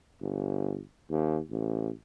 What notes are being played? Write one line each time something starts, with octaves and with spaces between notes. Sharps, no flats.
G1
D#2
A1